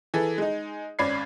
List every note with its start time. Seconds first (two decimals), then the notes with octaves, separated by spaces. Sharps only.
0.14 E3 G#4 A4
0.38 G#3 D#4
0.99 G#1 C#4 D5 B5 G#6 C7